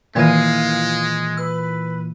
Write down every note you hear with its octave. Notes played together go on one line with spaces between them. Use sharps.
A#2 D#3 E3 G#3 F5 G#5 G#6 D#7
B4 E6